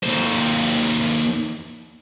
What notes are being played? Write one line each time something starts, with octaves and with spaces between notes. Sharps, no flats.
D#2 C5